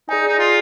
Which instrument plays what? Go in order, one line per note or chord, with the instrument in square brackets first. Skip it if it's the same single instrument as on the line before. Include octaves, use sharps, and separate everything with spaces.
[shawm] D#4 [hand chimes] G#4 D5 G#5
[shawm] D#4
F4